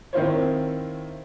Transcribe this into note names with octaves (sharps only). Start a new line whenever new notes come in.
D#3 C4 E4 F4 C5 C#5